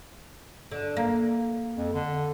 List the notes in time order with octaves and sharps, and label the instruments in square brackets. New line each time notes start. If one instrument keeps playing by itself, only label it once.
[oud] D3
A#3
[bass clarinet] F2
D3